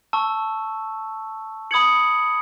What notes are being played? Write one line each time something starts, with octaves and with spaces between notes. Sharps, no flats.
A5 C#6 E6
B5 D#6 G#6 C#7 F#7